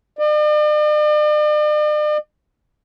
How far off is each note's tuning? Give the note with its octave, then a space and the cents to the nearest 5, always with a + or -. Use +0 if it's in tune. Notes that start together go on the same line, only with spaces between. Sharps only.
D5 +45